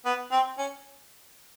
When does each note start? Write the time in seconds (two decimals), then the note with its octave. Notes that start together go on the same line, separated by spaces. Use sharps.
0.05 B3
0.32 C4
0.58 C#4